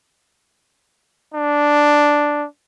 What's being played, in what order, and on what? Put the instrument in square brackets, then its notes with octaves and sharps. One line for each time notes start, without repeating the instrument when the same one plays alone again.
[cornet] D4